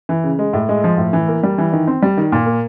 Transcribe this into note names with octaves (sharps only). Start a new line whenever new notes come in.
E3
C#3
G#3
A2
G#3
F3
A2
E3
A#3
G3
E3
D#3
C4
G3
D#3
A#2
A#3